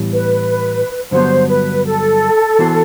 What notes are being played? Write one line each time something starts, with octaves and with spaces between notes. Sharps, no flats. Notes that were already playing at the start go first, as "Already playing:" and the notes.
Already playing: A2 E3 G3 B3
B4
G2 D3 F#3 B3 C5
B4
A4
E3 B3 F#4 C5